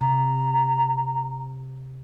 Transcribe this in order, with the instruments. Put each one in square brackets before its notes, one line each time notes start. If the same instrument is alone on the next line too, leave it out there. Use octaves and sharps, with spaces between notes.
[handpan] C3 [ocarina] A#5